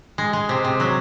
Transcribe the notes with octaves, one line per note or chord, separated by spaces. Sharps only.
G#3
G#3
C3
C3
F#3